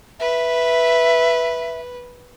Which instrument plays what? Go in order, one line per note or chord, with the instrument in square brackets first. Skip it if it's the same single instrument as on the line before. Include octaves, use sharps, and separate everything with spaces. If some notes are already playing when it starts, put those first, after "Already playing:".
[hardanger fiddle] B4 [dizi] E5